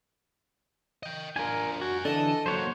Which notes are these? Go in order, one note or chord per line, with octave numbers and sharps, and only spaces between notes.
D#5 G5
D4 F4 A#4 G#5
F#4 F#5 G#5
D3 E3 D4 A4 D#5
F#3 A#3 C5 C#5 F#5